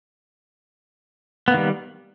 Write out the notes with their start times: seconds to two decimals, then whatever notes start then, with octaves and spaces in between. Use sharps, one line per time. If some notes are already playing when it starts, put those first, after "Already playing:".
1.48 B3
1.51 A#3
1.54 D#3
1.57 G3